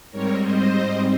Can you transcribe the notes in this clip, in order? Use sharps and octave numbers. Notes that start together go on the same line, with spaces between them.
G#2 G3 C4 A#4 C#5
C5 D#5